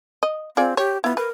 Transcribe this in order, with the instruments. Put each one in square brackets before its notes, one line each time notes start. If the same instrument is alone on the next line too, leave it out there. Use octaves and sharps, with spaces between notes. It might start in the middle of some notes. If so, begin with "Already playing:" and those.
[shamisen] D#5
[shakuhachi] C4 [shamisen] F4 G#4 D5
[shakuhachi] G4 [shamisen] C#5
[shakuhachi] B3 [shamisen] E4 F4
[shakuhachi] A#4 [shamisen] B4